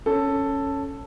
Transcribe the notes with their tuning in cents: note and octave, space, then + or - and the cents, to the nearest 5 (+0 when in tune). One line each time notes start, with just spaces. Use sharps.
C#4 +0 A4 +5